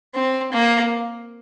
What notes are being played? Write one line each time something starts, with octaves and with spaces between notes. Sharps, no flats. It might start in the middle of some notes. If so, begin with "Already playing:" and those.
C4
A#3